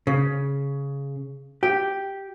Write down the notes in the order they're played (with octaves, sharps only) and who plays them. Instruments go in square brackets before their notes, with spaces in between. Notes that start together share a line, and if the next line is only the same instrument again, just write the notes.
[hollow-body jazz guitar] C#3
G4